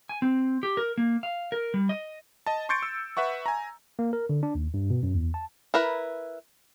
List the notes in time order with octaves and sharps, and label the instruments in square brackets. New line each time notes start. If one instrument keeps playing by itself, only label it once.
[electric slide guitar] G#5
C4
G4
A#4
A#3
F5
A#4
G3
D#5
[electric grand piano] D#5 A5
C6 C#6 G6 A6 C#7 D7
E6
B4 E5 F#5 C#6
G#5 A#5
[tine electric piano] A#3
A#4
D3
D4
D#2
G2
B2
F#2
E2
A5
[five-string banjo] E4 A#4 B4